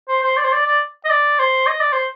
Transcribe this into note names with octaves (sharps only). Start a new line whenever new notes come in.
C5
C5
D5
C5
D5
D5
D#5
D5
C5
D#5
D5
C5